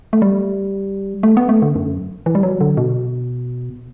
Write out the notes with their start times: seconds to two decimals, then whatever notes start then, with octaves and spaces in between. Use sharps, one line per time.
0.13 A3
0.22 G3
1.23 A3
1.37 B3
1.49 A3
1.62 D3
1.76 F#2
2.26 E3
2.35 G3
2.43 F#3
2.61 D3
2.77 B2